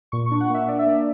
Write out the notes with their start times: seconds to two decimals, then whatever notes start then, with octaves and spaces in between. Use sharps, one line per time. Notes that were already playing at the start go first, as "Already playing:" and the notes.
0.12 A#2 C#6
0.26 C#6
0.31 D4
0.40 F#5
0.50 A#3 E5
0.68 D4 D5
0.79 E5
0.86 A#3 D5